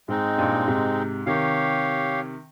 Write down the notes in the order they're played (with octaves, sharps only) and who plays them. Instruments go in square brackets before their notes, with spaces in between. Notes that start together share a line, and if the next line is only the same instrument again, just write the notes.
[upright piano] G#2 [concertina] G#3 C4 D#4
[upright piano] G2 A#2
G#2 C3
[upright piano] C3 D#3 [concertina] G4 C#5 F5